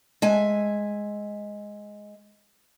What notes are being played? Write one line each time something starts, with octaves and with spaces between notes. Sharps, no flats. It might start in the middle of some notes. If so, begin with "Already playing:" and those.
G#3 E5 G#5